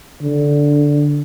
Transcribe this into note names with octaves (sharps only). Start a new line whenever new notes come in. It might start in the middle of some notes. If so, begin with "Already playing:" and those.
D3